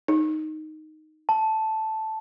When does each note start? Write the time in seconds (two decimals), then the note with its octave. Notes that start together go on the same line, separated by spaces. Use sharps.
0.08 D#4
1.29 A5